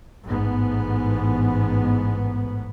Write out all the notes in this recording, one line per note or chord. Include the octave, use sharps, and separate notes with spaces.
A1 G#2 B3